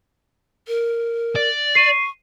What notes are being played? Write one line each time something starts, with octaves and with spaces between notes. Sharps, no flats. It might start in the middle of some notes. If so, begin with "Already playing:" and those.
A#4
D5
C#6 C7 D#7